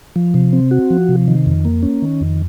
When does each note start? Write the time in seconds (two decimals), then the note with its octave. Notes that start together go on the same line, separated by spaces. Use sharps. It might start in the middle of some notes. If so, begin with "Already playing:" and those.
0.16 F3
0.34 C3
0.53 C4
0.71 F#4
0.90 F3
1.09 C3
1.28 D#3
1.46 F2
1.65 A#3
1.83 C#4
2.02 D#3
2.21 F2